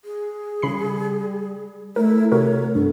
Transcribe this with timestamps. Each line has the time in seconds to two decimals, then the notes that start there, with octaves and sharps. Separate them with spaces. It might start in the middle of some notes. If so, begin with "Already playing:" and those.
0.05 G#4
0.62 C#3 G3 B5 C7
1.96 A3 E4 A#4
2.32 C3 F#4 A#4 C#5
2.75 G2 B3 A4